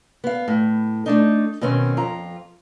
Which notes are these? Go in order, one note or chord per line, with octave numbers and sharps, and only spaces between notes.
B3 F5
A2
A3 D4 D#4
B2 D#3 C4 C#4
F2 F4 A#5